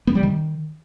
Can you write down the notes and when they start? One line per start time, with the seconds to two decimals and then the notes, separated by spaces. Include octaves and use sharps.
0.07 B3
0.15 G3
0.23 D#3